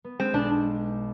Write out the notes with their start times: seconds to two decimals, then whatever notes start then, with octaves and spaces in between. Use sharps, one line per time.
0.04 B3
0.19 G#3 C4
0.34 B1 D4